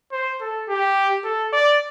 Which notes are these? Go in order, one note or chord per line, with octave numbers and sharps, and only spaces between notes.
C5
A4
G4
A4
D5